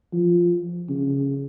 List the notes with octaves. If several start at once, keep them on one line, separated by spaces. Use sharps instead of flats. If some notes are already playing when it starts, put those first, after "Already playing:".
F3
C#3